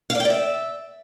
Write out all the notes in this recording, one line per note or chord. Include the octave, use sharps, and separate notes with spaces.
F5
D5
G5
D5
E5